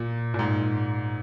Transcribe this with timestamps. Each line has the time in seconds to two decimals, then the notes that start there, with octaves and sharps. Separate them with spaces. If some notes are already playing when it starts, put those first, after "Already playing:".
Already playing: A#2
0.34 A#2
0.39 G#2